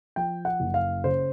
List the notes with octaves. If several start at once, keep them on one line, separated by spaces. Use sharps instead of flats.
F3 G5
F#5
F#1
F5
C#3 C5